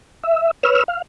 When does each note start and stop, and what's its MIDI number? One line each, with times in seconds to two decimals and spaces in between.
0.24 0.51 76
0.63 0.83 71
0.63 0.83 73
0.63 0.83 88
0.63 0.83 89
0.88 1.02 77